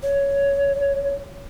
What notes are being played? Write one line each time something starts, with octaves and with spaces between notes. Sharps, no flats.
C#5